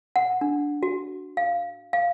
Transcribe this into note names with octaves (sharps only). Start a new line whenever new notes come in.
F#5
D4
F#4
F5
F5